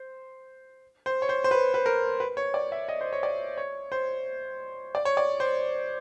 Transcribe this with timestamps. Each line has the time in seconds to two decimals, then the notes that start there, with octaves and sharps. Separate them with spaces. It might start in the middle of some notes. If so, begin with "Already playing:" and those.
Already playing: C5
1.06 C5
1.22 C#5
1.29 C5
1.44 C5
1.51 B4
1.74 B4
1.86 A#4
2.20 B4
2.37 C#5
2.54 D5
2.72 E5
2.88 D#5
3.01 C5
3.13 C#5
3.23 D5
3.58 C#5
3.92 C5
4.95 D5
5.05 C#5
5.17 D5
5.40 C5